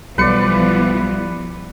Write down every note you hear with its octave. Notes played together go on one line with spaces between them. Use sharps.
B1 E3 F3 G3 B3 B4 D5 C#7